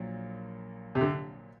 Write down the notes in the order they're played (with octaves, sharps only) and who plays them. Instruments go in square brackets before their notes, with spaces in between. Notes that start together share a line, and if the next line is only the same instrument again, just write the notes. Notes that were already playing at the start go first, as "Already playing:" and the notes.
Already playing: [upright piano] A#1 A#2 F#3
[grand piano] C3
D3